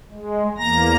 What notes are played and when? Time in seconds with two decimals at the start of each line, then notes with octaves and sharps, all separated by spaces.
0.11 G#3
0.58 E2 A#3 A#5 A#6